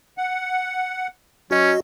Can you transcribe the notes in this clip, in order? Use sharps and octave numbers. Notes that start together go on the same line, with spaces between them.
F#5
F#3 C#4 F#4 D#5